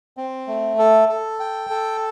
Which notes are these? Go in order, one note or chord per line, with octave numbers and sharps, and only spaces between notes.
C4
A3
A4
A4
G5
A4